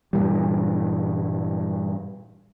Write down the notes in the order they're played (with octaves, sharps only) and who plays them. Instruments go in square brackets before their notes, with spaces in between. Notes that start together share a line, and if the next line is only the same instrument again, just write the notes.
[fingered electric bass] G2 A#2 E3 G3